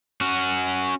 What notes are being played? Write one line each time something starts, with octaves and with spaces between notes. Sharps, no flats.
C#4 F#4